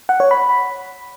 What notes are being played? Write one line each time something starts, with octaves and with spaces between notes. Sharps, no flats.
F#5
C#5
B5